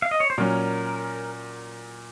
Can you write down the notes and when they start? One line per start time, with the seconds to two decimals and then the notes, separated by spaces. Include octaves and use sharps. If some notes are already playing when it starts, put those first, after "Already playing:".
0.02 F5
0.11 D#5
0.20 C#5
0.30 C5
0.38 A#2 F#3 C#4 A#4